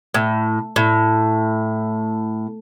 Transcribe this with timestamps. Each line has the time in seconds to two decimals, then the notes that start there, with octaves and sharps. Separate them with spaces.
0.14 A2
0.76 A2